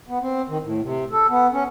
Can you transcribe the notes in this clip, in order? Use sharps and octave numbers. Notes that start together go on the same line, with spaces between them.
B3
C4
D#3
A2
C3
A4
B3
C#4